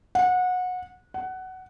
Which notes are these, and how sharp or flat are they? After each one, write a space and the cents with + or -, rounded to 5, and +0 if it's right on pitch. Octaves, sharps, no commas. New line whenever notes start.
F#5 -25
F#5 +15